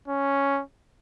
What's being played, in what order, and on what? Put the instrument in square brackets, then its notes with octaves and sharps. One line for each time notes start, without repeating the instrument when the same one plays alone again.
[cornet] C#4